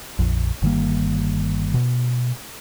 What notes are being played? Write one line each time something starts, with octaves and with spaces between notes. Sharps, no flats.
A#1 F2
G1 D#3 G3 A#3
B2